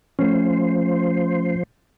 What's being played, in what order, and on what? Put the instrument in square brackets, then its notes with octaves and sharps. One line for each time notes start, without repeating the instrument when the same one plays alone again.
[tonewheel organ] F3 C5 [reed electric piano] A3 C#4